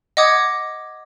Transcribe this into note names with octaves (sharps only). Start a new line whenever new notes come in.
D#5 F#5 D6 D#6 G#6